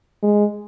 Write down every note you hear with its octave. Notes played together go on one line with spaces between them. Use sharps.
G#3